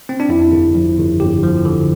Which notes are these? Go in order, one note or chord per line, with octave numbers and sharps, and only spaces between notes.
C4
D4
F2 E4
G1
F3
G1
G1 G4
F3
D3